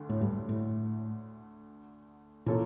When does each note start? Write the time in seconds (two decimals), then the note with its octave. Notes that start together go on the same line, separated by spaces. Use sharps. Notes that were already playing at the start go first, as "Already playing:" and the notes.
Already playing: D2 D3 A3 D4
0.09 A2
0.21 G2
0.49 A2
2.46 A#2 E3 A#3 C#4 F4 A4